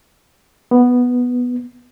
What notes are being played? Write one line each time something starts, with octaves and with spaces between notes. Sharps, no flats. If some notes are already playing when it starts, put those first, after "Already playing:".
B3